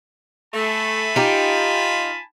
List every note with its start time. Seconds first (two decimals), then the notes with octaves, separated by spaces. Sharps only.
0.54 A3 G#5 A5 B5
1.16 D#4 F4 G4